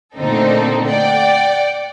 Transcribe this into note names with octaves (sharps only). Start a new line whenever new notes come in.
A#2 D3 A3 C4 D#4 A4
D5 F#5 G5